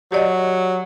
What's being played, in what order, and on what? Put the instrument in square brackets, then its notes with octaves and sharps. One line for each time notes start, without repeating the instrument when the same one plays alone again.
[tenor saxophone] F#3 [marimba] G4 D5 D#5